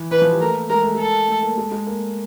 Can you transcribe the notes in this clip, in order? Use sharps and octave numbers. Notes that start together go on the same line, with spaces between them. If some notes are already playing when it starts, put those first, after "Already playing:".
Already playing: E3
E3 B4
F3
G3
A3 A#4
A#3
G#3 A#4
A3
G#3 A4
A3
A#3
G#3
G#3
A#3